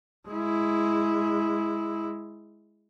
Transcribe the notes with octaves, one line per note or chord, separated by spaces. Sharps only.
G#3 E4